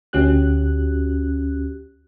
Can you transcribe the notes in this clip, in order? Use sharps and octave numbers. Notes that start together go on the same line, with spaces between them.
D2 C#4 F#4 G4 F#6